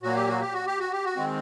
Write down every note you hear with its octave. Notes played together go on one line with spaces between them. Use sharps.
A#2 F#3 A#3 F#4
G4
F#4
G4
F#4
G4
F#4
G4
F#4
D#3 G#3 C4